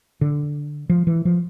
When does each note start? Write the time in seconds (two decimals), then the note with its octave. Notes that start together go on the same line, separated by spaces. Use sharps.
0.21 D3
0.90 F3
1.07 E3
1.25 F3